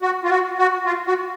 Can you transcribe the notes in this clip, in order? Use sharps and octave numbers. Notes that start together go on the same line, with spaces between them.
F#4
F4
F#4
F#4
F4
F#4